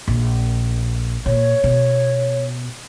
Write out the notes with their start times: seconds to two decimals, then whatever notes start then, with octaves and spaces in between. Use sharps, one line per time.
0.08 A#1
1.26 A#2 C#5
1.64 B2